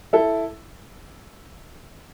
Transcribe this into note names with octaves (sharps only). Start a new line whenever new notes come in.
E4 A4